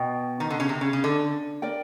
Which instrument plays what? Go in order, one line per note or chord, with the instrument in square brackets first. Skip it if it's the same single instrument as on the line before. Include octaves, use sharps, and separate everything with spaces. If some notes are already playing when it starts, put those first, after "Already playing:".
Already playing: [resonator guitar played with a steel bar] B2 [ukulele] B4 G5
[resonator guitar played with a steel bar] D#3
D3
C#3
C3
C#3
C#3
D3
[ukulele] A#4 D5 G5